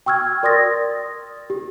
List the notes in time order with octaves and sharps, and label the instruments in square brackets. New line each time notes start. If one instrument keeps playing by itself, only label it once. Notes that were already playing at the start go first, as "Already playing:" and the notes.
[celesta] G5 C#6 E6 F6 G#6
A#4 D5 C6 D#6 A6 A#6
G4